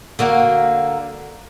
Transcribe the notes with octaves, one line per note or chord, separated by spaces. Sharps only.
D3 A#3 F#4